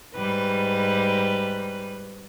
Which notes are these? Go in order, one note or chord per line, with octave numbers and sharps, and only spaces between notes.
G#2 G3 B4